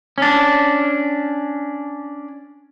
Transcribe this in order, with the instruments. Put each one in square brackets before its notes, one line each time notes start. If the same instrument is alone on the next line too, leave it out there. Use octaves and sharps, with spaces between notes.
[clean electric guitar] C#4 D4